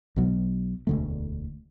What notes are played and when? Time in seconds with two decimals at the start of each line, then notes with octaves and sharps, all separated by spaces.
0.16 B1 B2 F#3
0.87 E1 D2 D3 A3